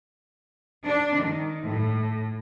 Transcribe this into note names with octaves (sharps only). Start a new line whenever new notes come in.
D4
D#3
A2